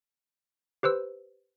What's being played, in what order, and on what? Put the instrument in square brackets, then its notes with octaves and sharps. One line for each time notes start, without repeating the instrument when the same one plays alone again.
[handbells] G4 B4 C5 E6